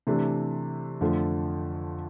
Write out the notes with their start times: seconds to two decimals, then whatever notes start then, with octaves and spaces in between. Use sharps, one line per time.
0.07 C3 E3 A3 D4
1.01 F2 D3 F3 A3